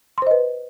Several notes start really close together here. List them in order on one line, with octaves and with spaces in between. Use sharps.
C6 C5 D#5 B4